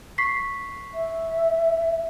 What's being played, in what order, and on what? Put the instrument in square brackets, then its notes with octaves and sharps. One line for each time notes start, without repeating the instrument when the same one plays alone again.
[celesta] C#6 B6 C7
[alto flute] E5